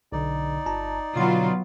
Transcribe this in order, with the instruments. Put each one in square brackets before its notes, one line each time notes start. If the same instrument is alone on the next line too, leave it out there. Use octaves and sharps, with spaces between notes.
[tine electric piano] B1 D3 [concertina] D#4 D5
[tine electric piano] G1 A5 A#5
[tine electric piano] B2 D3 C6 [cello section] F#3 B3 F4